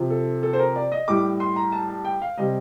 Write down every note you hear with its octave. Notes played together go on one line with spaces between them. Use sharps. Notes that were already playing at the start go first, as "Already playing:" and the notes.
Already playing: C3 F3
A4
A4
C5
A#4
D5
D#5
A2 G3 D6
C6
A#5
A5
A5
G5
F5
C3 G3 D#5